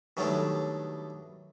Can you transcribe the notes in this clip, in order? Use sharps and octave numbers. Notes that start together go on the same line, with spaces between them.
B2 D#3 F#3 G3 A3 D4